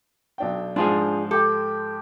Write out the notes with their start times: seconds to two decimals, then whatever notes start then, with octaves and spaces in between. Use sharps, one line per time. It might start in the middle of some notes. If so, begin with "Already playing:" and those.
0.38 B1 D4 G5
0.76 G#2 F3 D4 F4 G#4 C6
1.31 G4 A4